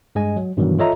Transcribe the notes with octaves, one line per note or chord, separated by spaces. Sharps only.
G2 G#3 D#5 G#5
F#3
G2 B2 D#3 E3 F#3
F4 A4 C#5 D#5 E5 A#5